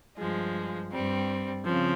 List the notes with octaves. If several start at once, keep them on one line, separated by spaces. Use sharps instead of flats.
G2 F3 G#3
G2 G3 C4
C#3 F3 C4